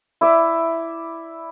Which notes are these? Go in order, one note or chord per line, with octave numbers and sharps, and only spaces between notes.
E4 D5 E5